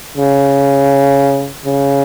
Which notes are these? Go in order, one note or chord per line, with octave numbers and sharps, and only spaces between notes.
C#3
C#3